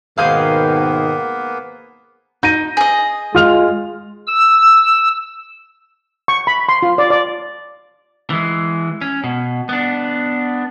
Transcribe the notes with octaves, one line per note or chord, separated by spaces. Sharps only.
G#2 B2 D#3 A#3 B3 G#4 C5 F5
D#4 G6 A#6 D#7
G#4 D#5
G#3 F4 F6 F7
E6
C#6
B5
C6
F4
D5
D5
E3 G#3
C#4
B2
B3 D4